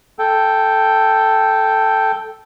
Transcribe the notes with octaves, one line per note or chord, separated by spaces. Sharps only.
A4 G5